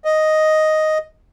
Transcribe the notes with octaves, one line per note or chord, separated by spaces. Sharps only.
D#5